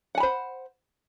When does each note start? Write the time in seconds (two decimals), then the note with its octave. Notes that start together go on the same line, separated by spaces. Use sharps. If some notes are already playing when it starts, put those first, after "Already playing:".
0.15 F#5
0.18 G#5
0.20 B5
0.23 C5